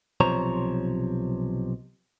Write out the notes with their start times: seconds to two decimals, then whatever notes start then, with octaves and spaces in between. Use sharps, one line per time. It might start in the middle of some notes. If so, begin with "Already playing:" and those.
0.21 B1 C3 F3 C5 C#5 A#5